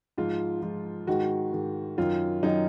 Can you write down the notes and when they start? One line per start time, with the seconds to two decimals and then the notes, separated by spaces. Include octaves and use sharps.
0.18 G#2 F3 F4
0.62 G#2 F3
1.07 G#2 D#3 F#4
1.53 G#2 D#3
1.98 F#2 D#3 F4
2.43 F#2 D#3 D#4